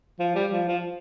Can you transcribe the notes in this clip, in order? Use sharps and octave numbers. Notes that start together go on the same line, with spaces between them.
F3
G3
F3
F3